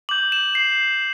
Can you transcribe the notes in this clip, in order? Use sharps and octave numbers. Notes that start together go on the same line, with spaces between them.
D6 G6 F#7
E7
C7